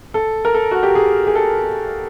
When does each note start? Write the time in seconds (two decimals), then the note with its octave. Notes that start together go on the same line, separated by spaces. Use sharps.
0.14 A4
0.45 A#4
0.54 A4
0.71 F#4
0.83 G4
0.95 G#4
1.27 G#4
1.35 A4